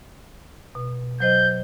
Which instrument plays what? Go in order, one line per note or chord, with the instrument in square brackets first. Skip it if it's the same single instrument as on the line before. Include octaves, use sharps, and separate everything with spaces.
[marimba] B2
[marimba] F#3 C5 D#5 [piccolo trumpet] G6